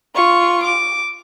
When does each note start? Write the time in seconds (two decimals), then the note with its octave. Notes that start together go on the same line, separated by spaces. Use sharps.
0.15 F4 C#6
0.64 D6